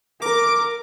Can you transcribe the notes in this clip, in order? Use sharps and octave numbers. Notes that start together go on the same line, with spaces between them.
A#4 D6